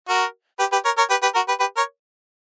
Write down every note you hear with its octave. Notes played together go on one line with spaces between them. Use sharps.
F#4 A#4
G4 B4
G4 B4
A#4 C#5
A#4 C#5
G4 B4
G4 B4
F#4 A#4
G4 B4
G4 B4
A#4 C#5